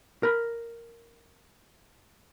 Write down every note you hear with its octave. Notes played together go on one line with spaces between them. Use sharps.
A#4 B5